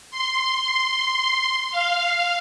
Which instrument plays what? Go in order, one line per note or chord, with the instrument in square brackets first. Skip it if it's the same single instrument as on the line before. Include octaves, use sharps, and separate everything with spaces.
[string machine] C6
F5